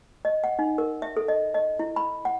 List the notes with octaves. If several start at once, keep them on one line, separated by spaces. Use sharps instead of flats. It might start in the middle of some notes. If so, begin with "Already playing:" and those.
D#5
F#5
D#4
A#4
E5
A4
D#5
D#5
E4
B5
F#5